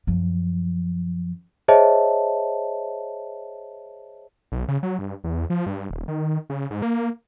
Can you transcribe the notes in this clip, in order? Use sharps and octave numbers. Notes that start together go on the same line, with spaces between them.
F#2 F3
G#4 C5 C#5 D#5 E5 A5
B1
C#3
F#3
G2
E2
F3
G2
D#1
D#3
C#3
G#2
A#3